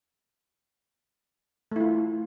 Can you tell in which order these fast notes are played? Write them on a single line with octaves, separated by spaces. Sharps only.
A3 E4 F4